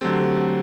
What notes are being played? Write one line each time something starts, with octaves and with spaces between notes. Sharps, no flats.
D3 F#3 A3 C4 G4 A4